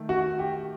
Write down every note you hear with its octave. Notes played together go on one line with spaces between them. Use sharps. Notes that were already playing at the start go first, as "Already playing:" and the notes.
Already playing: D#3 A3
F#4
G4